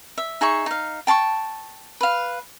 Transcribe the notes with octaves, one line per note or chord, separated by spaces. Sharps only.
E5
D#4 G#4 E5 C#6
D#4 F5
G5 A5 C6 C#6
B4 F5